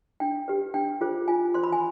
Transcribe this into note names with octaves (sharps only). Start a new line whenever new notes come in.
D4 G5
G4 B4
D4 G5
F4 G#4 C5
F4 G#5
C5 C6
B5
G#5